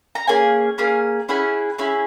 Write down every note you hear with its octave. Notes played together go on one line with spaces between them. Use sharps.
A#5
A#3 C#4 G#4 G#5
A#3 C#4 G#4
C#4 E4 G#4 F#5
C#4 E4 G#4